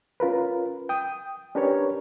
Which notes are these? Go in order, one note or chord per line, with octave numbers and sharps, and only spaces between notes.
C#4 F4 A#4 B4
G5 D#6
C#4 D4 G4 A#4 B4 C#5